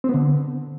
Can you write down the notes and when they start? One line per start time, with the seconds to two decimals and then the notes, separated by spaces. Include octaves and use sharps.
0.04 C4
0.09 B3
0.14 D3